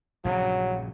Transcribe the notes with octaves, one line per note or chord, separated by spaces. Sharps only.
A#1 G2 C#3 F#3